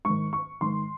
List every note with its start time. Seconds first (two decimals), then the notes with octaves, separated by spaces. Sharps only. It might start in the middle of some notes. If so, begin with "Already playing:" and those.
0.05 G#2 D#3 C#6
0.33 C#6
0.61 G#2 D#3 C6